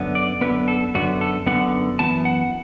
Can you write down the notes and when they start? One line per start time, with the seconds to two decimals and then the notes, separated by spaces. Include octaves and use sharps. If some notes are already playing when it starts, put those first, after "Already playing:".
Already playing: F#2 D3 B3
0.15 D5
0.41 F#2 D3 B3 B4
0.68 A4
0.95 F#2 D3 B3 F#4
1.21 A4
1.46 F#2 D3 B3 F#5
1.99 F#2 E3 B3 A5
2.25 F#5